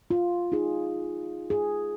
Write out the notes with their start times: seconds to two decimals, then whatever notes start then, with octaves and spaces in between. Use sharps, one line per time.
0.10 F4
0.52 D#4 G#4
1.50 G#4